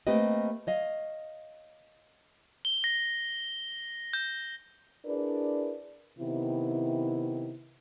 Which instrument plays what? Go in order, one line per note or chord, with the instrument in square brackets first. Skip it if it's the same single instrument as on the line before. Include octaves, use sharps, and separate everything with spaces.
[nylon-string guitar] A3 A#3 C4 G4 B4 D#5
C#5 D#5 F5
[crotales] G7
A#6
G6
[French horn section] D4 E4 G#4 A#4 B4 D5
C3 D#3 B3 E4